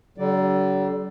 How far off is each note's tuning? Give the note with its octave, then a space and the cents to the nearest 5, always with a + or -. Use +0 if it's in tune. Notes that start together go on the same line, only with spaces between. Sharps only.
D3 -40 F#3 +45 D5 +0